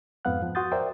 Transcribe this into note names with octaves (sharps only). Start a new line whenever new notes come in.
F2 G#2 B3 F5 F#5 F#6
F3
F#4 F#5 C6 D#6 G6 A6
A#4 C5 D5 E5 G5